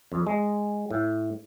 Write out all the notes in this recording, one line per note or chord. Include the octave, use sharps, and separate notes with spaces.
F2
G#3
A2